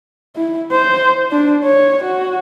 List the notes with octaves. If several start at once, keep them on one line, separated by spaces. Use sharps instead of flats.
E4
C5
D4
C#5
F#4